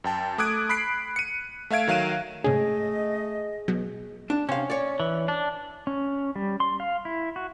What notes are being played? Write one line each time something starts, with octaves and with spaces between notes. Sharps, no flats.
F#2 G5 A5
A3 D6 D#6 F#6 G#6 D7
B5 F#6 B6 C7 D7
C#7 D#7
A3 E5 F5 G#6 D7
D#3 F#3 F5 F#6 D#7 E7
G#2 C3 A3 C#4 G#4 D#5
B2 F#3
D4
C3 C#4 F5
C#5 D5
E3
D4
C#4
G3
C6
F5
E4
F#4